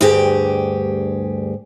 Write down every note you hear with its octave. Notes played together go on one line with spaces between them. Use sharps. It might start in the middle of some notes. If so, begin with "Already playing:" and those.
D2 G2 G4 G#4